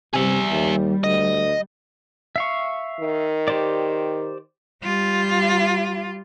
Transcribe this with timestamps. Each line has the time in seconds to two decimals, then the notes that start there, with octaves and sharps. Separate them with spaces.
0.14 C3 G3 G#4 E5
0.51 D#2
1.04 D2 D#5
2.36 E5 F5 C#6
3.00 D#3
3.48 G4 C5 D5
4.84 G3 F4